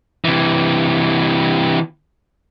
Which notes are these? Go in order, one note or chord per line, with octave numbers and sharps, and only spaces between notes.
C3 E3